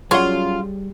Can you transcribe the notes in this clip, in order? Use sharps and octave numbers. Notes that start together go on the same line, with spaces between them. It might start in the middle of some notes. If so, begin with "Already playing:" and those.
F#3 G3 C#4 F4 G#4 C#5 F#5 C6